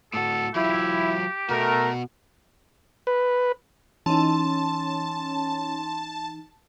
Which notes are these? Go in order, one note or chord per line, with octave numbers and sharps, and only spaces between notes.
A2 F#4 A4
F#3 E4 F4 G4
B2 A3 F#4 A#4
B4
E3 C#4 D#4 A5 C6